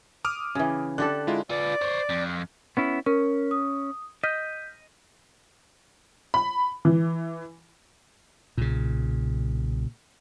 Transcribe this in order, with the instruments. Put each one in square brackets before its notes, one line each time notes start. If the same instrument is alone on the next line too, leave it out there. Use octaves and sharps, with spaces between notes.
[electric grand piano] D6 D#6 F6
[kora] C#3 E3
[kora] D3 G4 A4 [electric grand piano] F#6
[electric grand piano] G#3 E4 F4
[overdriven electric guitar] F4 B4 [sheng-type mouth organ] D5
[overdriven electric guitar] C5 C#5
F2
[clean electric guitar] B3 C#4 E4
[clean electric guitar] C#4 [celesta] A#4
[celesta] D#6
[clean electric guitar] D#5 [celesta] F6 G6 B6
[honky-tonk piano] B5
E3
[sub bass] B1 [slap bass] A#2 C#3